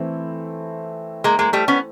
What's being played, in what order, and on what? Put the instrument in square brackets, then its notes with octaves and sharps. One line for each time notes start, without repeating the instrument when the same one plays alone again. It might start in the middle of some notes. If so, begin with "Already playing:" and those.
Already playing: [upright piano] E3 A3 C4 E4
[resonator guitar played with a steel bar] G#3 A#3
G#3 A#3
G3 A3
B3 C#4